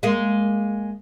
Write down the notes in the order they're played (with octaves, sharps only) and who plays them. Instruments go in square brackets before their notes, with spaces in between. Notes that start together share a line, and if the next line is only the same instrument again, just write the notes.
[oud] G#3 A#3